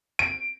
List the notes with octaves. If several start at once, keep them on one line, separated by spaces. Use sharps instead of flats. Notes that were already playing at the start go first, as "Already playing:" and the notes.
D7